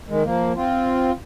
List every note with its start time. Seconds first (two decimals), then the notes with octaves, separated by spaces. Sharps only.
0.09 D#3 G#3
0.24 F3 A#3
0.56 C4 F4